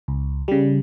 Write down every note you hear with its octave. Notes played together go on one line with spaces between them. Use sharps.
C#2
C#3 G3